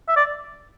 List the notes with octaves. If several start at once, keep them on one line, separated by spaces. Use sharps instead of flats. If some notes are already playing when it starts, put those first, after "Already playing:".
E5
D5